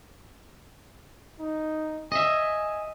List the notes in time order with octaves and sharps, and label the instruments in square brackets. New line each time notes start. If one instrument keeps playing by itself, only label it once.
[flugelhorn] D#4
[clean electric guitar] D#5 E5 [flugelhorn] G#5